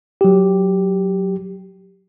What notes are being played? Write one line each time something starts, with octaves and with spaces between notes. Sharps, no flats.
F#3 G4